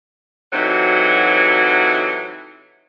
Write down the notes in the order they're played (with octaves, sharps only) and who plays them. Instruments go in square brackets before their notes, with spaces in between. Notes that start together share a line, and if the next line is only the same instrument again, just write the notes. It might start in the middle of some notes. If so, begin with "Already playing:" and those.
[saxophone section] A2 C3 E3 F#3 D#4 F#4